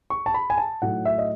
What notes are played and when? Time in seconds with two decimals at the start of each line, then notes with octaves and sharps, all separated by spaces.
0.10 C#6
0.26 A5
0.34 B5
0.50 G#5
0.58 A5
0.82 A2 F#3 A3 D#4 F#5
1.05 E5
1.18 D#5